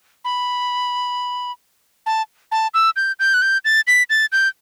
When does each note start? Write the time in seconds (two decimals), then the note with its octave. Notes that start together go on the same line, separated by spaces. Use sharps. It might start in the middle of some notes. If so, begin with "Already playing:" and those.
0.25 B5
2.06 A5
2.52 A5
2.74 E6
2.96 G6
3.20 G6
3.34 F#6
3.42 G6
3.65 A6
3.87 B6
4.10 A6
4.32 G6